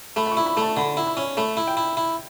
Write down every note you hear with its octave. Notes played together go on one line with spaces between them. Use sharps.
A3 B5
B5
C#6
E4
B5
A3 A5
D3 B5
E4
B5
C#4
A3 B5
E4
G5
E4
E4